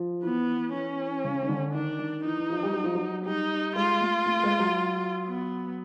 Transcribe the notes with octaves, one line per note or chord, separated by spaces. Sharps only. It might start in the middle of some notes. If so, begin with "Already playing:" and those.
Already playing: F3
E3 B3
E3 C#4
C#3
D#3
D3
D#3 D4
D#3
E3 D#4
E3
F3
G3
F#3
F3
F#3
G3 D#4
G#3 F4
A3
A3
G#3
F#3
B3